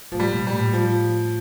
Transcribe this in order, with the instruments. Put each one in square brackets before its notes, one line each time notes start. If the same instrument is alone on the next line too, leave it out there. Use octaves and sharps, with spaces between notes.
[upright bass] A2 [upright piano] F3
[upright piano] G3
[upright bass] A#2
[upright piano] G3
[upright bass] A2
[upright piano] F3